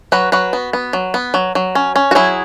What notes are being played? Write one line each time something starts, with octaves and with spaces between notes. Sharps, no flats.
F#3 F#4 B4
F#3 F#4 B4
B3
B3
F#3
B3
F#3
F#3
C#4
C#4
F#4
F#3 E4 G#4